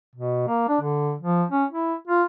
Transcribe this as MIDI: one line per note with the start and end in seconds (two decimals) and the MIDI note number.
0.15 0.44 47
0.48 0.66 58
0.69 0.77 62
0.81 1.15 50
1.21 1.44 53
1.50 1.64 61
1.71 1.94 64
2.07 2.24 65